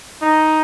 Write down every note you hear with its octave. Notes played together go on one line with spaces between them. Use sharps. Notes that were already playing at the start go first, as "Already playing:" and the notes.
D#4